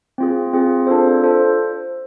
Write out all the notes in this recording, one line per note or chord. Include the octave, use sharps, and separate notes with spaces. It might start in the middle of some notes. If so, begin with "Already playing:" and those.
C4 F4 G#4
C4 F4 G#4
D4 F4 A4 C5
D4 F4 A4 C5